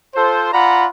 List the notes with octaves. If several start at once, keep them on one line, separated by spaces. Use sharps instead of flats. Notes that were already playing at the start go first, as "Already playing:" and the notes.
F4 A4 C5
F4 D5 F#5 A#5 B5